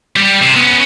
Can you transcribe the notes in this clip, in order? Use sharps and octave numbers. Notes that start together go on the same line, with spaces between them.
G3 G4
C3
B3 C#4